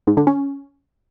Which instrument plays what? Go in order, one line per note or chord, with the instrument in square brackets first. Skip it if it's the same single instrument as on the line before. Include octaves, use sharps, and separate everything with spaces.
[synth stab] G#2
D3
C#4